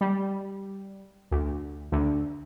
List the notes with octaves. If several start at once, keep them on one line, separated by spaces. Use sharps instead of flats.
G3
D2
D2